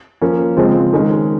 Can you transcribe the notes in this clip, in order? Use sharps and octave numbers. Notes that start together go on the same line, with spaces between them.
F3 A#3 C#4
C#3 F3 G#3 C4
D#3 G#3 C#4